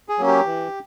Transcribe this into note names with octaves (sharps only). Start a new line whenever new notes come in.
G#4
F#3 A#3 C#4
G4
E3